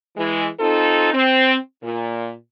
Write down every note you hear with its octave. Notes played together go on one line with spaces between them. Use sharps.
E3 G#3
C4 D#4 F4 A4
C4
A#2